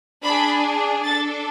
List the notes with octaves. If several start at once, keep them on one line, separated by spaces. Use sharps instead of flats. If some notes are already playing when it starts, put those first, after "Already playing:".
D4 G#4 B5
D4 A4 A6